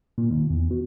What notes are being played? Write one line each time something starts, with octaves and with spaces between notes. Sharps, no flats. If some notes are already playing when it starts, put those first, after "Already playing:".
A#2
D#2
E2
B2